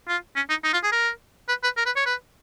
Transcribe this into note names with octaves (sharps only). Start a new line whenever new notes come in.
F4
C#4
D#4
D#4
F4
G#4
A#4
B4
B4
A#4
B4
C#5
B4